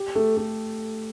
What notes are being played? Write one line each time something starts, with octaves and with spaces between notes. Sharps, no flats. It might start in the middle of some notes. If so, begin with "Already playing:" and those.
Already playing: G4
A3
A3